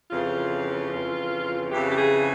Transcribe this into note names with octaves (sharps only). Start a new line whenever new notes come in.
F2 C#3 E3 F4
F2 C#3 E3
F2 C#3 E3 G4
G4
G#4